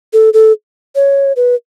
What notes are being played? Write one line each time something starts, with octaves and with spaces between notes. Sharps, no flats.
A4
A4
C#5
B4